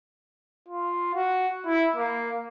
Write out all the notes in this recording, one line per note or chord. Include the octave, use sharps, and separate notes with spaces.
F4
F#4
E4
A#3